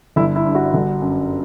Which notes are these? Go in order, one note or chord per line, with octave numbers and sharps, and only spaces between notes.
G1 E4
E4
G2
F#4
G1
F#2